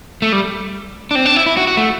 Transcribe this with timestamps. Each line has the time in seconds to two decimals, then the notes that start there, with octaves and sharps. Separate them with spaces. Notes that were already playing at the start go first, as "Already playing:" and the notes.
0.22 A3
0.32 G3
1.11 D4
1.15 C4
1.26 D4
1.36 E4
1.46 E4
1.57 F#4
1.67 F#4
1.77 A3